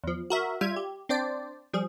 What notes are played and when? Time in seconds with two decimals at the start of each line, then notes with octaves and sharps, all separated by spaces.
0.04 E2 F3
0.30 F#4 A#4 E5
0.61 G3 F4 E5 G#6
0.76 G4
1.09 C4 D4 C5 D5
1.73 F3 G3 G#4